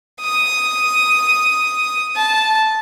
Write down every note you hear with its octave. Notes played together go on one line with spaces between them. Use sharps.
D#6
A5